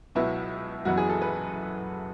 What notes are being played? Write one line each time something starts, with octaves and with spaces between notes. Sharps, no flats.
C#2 B2 F#3 B3 E4
F#1 F#2 E3 B3 E4 F#4
G#4
A4
B4